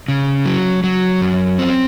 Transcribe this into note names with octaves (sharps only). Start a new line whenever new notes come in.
C#3
F#3
F#3
F#2
C4